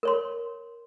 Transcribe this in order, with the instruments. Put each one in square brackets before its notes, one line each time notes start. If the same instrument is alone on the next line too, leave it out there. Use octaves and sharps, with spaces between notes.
[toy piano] A#4 C#5 C6